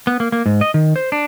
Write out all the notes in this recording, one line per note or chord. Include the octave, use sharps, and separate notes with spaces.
B3
A#3
A#3
G#2
D#5
D#3
C5
D4